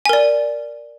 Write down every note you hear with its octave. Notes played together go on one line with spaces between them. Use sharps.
A#4 D5 G#5